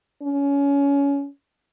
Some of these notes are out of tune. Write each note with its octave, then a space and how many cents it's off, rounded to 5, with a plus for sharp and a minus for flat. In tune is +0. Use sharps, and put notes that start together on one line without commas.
C#4 +20